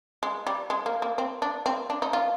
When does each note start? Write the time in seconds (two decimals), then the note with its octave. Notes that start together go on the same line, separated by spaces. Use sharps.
0.23 G#3
0.47 G3
0.70 G#3
0.86 A#3
1.02 A#3
1.18 C4
1.42 D4
1.66 C4
1.90 D4
2.02 D#4
2.13 F4